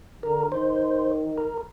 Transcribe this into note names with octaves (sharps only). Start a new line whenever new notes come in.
D3 A#4
D#3 C5
A#4